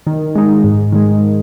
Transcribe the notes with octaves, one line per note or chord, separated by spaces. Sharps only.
D#3
G#3 D#4
G#2
D#3 G#3